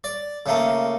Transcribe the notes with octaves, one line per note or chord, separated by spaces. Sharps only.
D5
C#3 A3 A#3